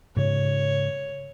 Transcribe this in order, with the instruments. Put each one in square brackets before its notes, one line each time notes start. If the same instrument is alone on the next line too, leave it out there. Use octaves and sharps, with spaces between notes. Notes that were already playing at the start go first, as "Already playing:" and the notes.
[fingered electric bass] G#2 C#3 [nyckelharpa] C#5